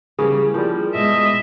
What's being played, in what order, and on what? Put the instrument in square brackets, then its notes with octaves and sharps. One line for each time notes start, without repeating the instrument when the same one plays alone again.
[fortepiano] C#3 [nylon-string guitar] E3 G3 A#3 [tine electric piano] G#4
[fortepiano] F3 G3 [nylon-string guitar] A#3 C#4
[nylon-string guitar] B2 G#3 B3 [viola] D#5 E5